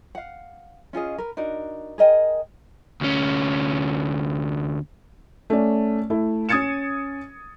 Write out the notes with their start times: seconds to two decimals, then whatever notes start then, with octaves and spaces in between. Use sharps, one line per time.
0.15 F5 F#5
0.93 C#4 F4 G#4 D#5
1.18 A#4 B4
1.37 D4 D#4 F#4 A#4
1.98 G#4 A#4 D#5 G5
3.01 D2 C#4
5.50 A3 C#4 D5
6.10 A3 E4
6.49 C#4 D#6 G#6 A6 C#7 E7